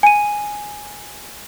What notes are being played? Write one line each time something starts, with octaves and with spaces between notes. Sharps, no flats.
G#5 D#7